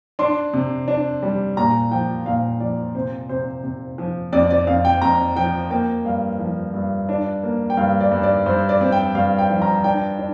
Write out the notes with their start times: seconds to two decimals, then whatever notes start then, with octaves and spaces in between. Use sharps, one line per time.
0.19 D4 C6
0.54 C3
0.88 D4
1.23 G3
1.57 A#2 A#5
1.91 F3 G5
2.26 A#2 F5
2.60 F3 D5
2.95 C3 C5
3.29 C3 C5
3.64 C3
3.98 F3
4.32 F2 D5
4.51 D5
4.67 F2 F5
4.85 G5
5.02 F2 A#5
5.36 F3 G5
5.70 A#3 G5
6.05 G2 F5
6.40 F3
6.74 G2
7.09 D4
7.43 A#3
7.70 G5
7.77 G2 F5
8.00 D5
8.12 G2
8.23 D5
8.46 G2 C5
8.69 D5
8.81 C4
8.92 G5
9.15 G2 F5
9.38 G5
9.50 F3
9.62 A#5
9.84 D4 G5
10.19 D4